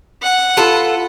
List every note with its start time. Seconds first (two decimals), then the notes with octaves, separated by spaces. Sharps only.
0.23 F#5
0.57 F4 A4 B4